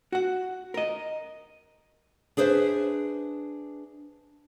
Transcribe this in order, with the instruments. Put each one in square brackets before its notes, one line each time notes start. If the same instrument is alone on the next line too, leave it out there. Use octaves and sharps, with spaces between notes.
[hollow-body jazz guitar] F#4 F#5
A#4 D#5
[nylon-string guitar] D4 G#4 B4 C5 E5